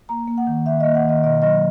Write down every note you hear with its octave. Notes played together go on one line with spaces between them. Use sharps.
A#3 A#5
A#3
F#5
D#3
D#3 E5
D#5
A#3
F#5
D#3 D#5
B2 D#5
F#3 D#5